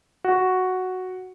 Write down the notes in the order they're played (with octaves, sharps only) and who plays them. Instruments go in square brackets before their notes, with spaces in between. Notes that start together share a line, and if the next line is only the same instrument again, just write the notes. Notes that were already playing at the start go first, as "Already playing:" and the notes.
[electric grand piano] F#4